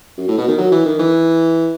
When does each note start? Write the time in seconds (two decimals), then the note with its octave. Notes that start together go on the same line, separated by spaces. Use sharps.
0.17 F#2
0.28 A2
0.38 B2
0.48 D#3
0.58 F#3
0.71 E3
0.85 D#3
0.99 E3